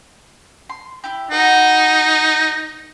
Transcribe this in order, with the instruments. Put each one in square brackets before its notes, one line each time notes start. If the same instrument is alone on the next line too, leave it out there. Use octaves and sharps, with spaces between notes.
[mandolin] C6
E4 G4
[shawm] D#4 [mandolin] F#4 B4 F#5